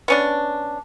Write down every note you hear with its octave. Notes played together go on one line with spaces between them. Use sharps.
B3 C#4 D4